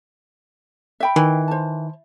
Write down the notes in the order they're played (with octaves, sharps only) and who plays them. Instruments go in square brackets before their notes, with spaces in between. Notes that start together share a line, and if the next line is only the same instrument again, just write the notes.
[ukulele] E5 G5 B5
[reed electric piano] D#3 [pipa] E3
[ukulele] C5 A5